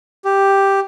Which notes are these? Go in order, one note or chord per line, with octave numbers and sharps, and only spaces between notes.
G4